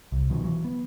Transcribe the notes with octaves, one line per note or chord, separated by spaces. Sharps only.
C2
B2 D#3 F3 F#3
E3 F#3
B3